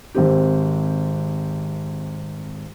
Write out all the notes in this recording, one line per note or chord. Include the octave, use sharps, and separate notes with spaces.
G#1 C4 G4